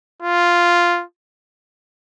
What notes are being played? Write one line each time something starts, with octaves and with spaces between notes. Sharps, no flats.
F4